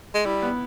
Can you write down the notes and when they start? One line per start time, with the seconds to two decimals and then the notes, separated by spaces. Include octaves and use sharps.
0.14 G#3
0.25 G3 E4
0.42 B3